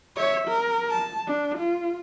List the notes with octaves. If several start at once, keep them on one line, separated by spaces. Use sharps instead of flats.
C#5 E5
A#4
A5
D4
F4